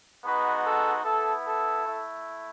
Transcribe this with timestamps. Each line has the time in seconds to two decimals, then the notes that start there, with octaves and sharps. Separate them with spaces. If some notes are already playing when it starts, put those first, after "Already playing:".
0.23 G#3 B3 D#4 F#4 B4
0.63 A4
1.04 B3 E4 A4
1.45 A4
1.84 A3 E4